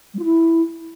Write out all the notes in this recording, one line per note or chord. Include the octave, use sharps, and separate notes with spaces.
G3
F4
E4